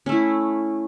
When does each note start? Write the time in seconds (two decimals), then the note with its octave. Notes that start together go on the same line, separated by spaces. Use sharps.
0.06 C#4
0.09 A3
0.12 E4